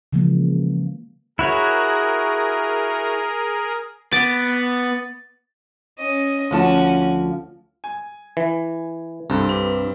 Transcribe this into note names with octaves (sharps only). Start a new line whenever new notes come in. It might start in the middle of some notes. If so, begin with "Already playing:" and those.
C#3 E3 F3 G#3 A#3
E4 F#4 G#4 A#4 C#5
B3 D6 A6
C#4 D#5
D2 F3 C#4 F#4 A5
G#5
E3
C2 G2 C4 A4
D4 B4